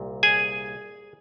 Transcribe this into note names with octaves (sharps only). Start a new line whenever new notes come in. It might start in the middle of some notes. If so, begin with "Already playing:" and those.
Already playing: C2 A#2
G#4 G#5